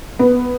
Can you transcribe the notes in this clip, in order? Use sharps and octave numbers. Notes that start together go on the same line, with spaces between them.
B3